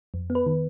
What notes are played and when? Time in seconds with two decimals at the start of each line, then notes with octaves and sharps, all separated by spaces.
0.14 F2
0.30 B3
0.35 B4
0.46 D#3